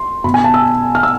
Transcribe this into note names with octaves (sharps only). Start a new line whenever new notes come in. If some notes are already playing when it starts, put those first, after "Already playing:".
Already playing: C6
B2 B5
G#5
A5
E6
F6
E6